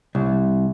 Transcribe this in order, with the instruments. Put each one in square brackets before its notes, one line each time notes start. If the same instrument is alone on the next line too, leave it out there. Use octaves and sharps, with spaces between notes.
[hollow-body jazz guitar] C2